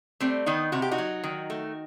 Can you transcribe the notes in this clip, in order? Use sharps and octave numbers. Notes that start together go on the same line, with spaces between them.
G3 A3 C4
D#3 B3 D#4
C3 F#4
G4
D#4 F#4
F#3
D#3
A3